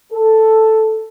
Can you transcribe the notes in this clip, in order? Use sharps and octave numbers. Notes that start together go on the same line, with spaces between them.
A4